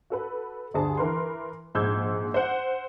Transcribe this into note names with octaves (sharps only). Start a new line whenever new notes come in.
F#4 A4 B4
D2 G2 D4 G#4 A5
E3 A#4 B4 C6
A#1 G#2 E6 G6 G#6
C5 F#5